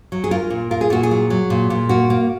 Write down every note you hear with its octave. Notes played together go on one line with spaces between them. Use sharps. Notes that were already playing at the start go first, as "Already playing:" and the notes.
F#3
G#4
F4 A#4
A#2
F4 A#4
G#4
A#2 F#4
G#4
F#3
F#3
A#2
A#2
A#3 F#4
A#3